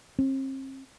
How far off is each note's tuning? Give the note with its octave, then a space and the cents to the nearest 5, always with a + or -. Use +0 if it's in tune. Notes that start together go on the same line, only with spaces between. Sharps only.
C4 +40